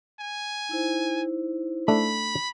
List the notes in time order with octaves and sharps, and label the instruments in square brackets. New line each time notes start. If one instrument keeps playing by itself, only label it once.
[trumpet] G#5
[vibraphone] D#4 E4 C5
[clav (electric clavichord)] A3 D4 E5 [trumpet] B5